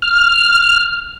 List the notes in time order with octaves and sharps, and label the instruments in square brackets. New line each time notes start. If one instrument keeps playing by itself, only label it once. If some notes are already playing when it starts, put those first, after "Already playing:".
[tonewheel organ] F6